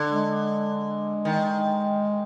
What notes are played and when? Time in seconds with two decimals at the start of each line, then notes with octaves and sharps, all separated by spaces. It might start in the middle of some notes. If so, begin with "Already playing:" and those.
Already playing: D3
0.11 G#3
1.25 D#3